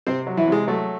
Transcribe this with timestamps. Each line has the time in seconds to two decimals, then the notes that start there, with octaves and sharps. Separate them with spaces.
0.07 C3 C4 C5
0.27 F#3
0.37 E3 E4
0.48 C3 G#3
0.68 F#3 A3